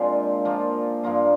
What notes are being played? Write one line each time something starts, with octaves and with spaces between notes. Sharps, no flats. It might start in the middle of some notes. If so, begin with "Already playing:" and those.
Already playing: A#2 F3 G#3 C4 D4 F4
F3 A#3 F4
G2 F3 A#3 F4